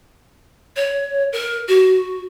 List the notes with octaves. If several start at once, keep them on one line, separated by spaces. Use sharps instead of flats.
C#5
A#4
F#4